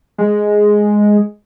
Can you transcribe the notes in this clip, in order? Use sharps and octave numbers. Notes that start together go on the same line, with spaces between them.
G#3